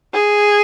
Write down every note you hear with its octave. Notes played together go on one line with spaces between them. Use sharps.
G#4